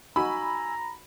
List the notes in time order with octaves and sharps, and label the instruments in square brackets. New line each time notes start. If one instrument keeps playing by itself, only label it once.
[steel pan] D#4 F#4 [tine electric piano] G#5 E6 [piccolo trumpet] A#5 [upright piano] B5